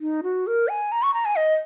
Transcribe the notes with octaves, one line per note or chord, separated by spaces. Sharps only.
D#4
F#4
A#4
G#5
A#5
C#6
A#5
G#5
D#5